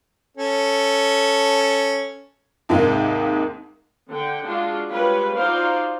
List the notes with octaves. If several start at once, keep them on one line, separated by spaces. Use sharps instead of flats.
C#4 A4
D#2 G#2 C3 D#3 G#3 A#3
D3 F#5 G5
G#3 D4 F4 F#4
G3 G#3 F4 B4 C#5
D#4 F4 F#4 C5 D5 F5